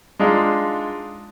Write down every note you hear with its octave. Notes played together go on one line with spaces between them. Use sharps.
G#3 D4 D#4 F4